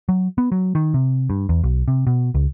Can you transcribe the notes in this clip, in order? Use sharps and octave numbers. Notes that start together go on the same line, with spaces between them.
F#3
B3
F#3
D#3
C3
G2
E2
B1
C3
B2
C#2